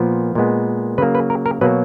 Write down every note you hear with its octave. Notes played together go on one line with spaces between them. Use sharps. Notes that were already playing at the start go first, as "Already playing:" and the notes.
Already playing: A#2 F3 B3
A#2 G#3 B3
C#3 F#3 A#3 B4
B4
A#4
A#4
B2 F#3 A#3 B4